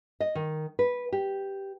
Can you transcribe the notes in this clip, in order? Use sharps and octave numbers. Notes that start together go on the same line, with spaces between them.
D#5
D#3
B4
G4